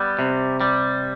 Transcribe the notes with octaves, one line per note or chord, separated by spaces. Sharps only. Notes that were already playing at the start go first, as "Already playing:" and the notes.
Already playing: G3 B3
C3
G3